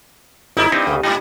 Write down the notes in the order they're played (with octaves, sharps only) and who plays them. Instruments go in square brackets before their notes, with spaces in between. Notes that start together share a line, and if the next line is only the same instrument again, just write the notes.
[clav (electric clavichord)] G#1 G3 [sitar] D#4 E4
[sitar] G2 [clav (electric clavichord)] C4 D#4 E4
[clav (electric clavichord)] D2 C#3
[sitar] G#2 [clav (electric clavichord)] G3 D#4